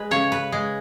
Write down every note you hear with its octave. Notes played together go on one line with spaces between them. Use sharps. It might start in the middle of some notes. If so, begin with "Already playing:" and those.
Already playing: G#3 B4
C#3 C#5
B4
G#3